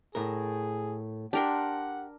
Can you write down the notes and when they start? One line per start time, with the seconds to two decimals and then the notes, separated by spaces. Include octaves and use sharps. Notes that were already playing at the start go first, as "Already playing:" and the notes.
0.15 A2 G#4 A#4
1.33 D4 G4 A#4 F#5 C6